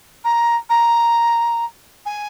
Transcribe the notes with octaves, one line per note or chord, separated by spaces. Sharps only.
A#5
A#5
G#5